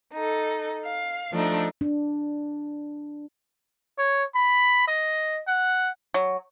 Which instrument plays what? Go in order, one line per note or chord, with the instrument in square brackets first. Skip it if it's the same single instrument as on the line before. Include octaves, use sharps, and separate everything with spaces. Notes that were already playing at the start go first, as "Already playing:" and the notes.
[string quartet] D#4 A4
F5
F3 A3 D4 D#4
[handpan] D4
[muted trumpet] C#5
B5
D#5
F#5
[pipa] F#3